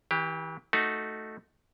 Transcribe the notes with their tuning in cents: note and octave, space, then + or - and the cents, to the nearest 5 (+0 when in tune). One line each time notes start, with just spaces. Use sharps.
E3 -35 G4 +10
A3 +0 D#4 +0 F#4 +0